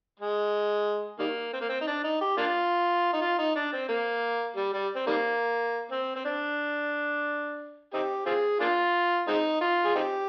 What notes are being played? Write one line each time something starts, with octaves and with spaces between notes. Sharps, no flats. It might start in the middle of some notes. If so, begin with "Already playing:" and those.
G#3
D#3 G3 A#3
C4
A#3
C4
D#4
D4
D#4
G4
A#3 D4 F4
D#4
F4
D#4
D4
C4
A#3
G3
G3
C4
D#3 G3 A#3
C4
C4
D4
C4 D#4 G4
C4 F4 G#4
A#3 D4 F4
G#3 C4 D#4
F4
G#4
C4 D#4 G4